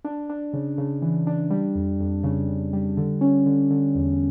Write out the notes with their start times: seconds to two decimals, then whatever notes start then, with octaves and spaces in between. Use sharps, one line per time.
0.05 D4
0.29 D4
0.53 C#3
0.78 C#3
1.02 E3
1.27 D4
1.50 G3
1.75 F2
2.00 F2
2.24 C#3
2.49 C#3
2.73 G3
2.97 D3
3.21 C#4
3.46 D3
3.71 D3
3.95 E2